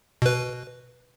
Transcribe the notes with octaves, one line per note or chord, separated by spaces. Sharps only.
B2 B4